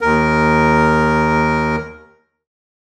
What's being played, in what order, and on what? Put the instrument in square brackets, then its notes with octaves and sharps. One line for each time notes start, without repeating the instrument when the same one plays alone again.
[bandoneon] D#2 A#4